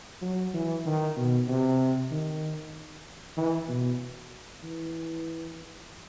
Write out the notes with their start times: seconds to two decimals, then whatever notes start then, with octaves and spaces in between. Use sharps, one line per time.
0.22 F#3
0.54 E3
0.86 D#3
1.16 B2
1.48 C3
2.11 D#3
3.37 E3
3.68 B2
4.63 E3